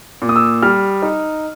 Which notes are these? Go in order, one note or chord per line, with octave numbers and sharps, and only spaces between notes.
A#2
D#6
E6
G3 F6
D#4